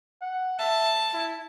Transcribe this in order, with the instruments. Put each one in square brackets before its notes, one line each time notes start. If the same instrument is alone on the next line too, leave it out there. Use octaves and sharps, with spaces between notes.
[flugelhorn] F#5
[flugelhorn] E5 [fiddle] A5
[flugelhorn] E4